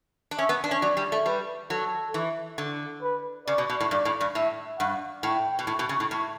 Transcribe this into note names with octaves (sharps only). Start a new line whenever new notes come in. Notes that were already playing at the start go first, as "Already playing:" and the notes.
D4
C#4 E5
B3
D4
C#4
F#3 D5
G3
A3
G3 B4
F#3 A4
E3
D3
B4
C#3 D5
B2
B2
A2
G2 D5
A2
G2
A2 E5
G2 F#5
A2 G5
B2
A2
B2
C#3
A2
A2